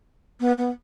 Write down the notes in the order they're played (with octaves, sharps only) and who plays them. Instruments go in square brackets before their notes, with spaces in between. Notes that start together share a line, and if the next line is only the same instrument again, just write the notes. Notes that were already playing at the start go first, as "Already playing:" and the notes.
[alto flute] B3
B3